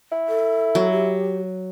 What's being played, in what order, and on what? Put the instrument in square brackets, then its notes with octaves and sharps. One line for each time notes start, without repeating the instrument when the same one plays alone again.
[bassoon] E4
[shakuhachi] A4
[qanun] F#3
[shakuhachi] G4